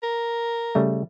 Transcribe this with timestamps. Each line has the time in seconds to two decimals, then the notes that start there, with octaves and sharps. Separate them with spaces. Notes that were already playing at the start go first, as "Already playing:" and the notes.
0.03 A#4
0.75 C#3 G3 A3